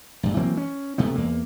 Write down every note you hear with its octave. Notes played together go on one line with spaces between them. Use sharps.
A#1 G2
E3 F#3 A#3 C4
C#4
D2 C3 A3 B3
E2 A#3